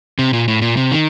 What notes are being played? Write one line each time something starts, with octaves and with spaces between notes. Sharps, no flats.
C3
A#2
A2
A#2
C3
D#3